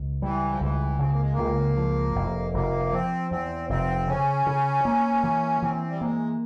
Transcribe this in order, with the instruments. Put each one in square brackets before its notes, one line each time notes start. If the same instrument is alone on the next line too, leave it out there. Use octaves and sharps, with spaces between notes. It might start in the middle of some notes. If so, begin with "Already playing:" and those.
Already playing: [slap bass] C#2
[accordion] E3 [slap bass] G3
[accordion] F3
[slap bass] C#2 [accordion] E3
[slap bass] C#3 [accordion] C4
[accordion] A#3
G#3
A#3
[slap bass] C#2
F3
F1
[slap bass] F1 [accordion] A#3
[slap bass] F3 [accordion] C4
[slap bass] E2 [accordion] C4
[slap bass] F1 [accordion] C4
[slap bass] C#3 [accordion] C#4
[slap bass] C#3
A#3
E3
[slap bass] E3 [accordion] C4
[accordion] G3
[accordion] G#3 [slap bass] A#3